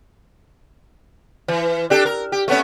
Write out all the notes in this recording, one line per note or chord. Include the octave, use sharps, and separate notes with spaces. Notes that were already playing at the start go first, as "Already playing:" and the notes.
E3
D4 G4 A4
A#4
G4
A3 B3 C#4